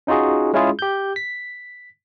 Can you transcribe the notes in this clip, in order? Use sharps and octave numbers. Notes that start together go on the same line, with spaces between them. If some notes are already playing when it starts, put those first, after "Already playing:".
C#4 D#4 F4 F#4 G#4
G#3 C#4 E4 F4 G#4
G4 G6
B6